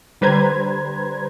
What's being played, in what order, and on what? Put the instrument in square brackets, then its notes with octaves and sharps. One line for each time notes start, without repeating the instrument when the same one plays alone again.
[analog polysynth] D3 G3 B4 C5 A#5 G#6